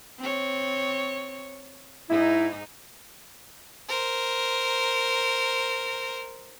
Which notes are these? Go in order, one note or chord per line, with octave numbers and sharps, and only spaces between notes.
C4 C#5
G#2 D#4 E4
A#4 C5